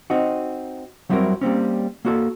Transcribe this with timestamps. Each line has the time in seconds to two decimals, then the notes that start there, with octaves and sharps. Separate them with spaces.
0.10 C4 D#4 F#4
1.09 F#3 G3 C4 E4 F#4 A#4
1.41 G3 A#3 C4 C#4
2.05 A#3 F#4 A4